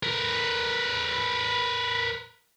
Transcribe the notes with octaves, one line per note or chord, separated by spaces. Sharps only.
A#4 B4